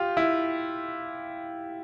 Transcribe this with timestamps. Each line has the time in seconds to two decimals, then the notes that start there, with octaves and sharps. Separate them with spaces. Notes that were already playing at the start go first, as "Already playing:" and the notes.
Already playing: F4 G4
0.17 E4